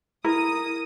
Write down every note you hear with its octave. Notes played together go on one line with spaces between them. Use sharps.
E4 A#4 D#6